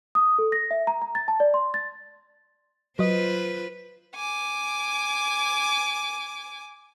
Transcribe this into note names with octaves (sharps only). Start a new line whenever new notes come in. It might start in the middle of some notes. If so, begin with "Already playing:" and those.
D#6
A4
A#6
E5
A#5
A#5
A6
A5
D5
C6
A6
F#3 F4 B4 C5 D#5
G#5 D6